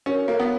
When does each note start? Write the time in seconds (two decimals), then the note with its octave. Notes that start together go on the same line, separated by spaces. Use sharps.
0.06 C#4 F#4 A#4 C#5
0.28 A#3
0.40 B3